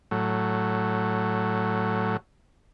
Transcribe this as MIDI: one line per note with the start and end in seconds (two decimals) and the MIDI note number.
0.11 2.17 45
0.11 2.17 54